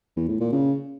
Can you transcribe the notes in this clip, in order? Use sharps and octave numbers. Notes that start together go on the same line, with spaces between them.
E2
A2
A#2
C#3